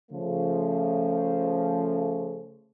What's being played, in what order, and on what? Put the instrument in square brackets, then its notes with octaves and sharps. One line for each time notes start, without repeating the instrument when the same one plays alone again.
[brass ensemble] C#3 F3 A3